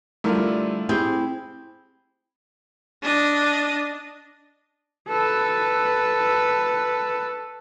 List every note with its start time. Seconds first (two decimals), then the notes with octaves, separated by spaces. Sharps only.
0.24 D3 G3 A3 E4 F4 A#4
0.89 C4 E4 G4 G#4
3.02 D4 D#5
5.08 A4 B4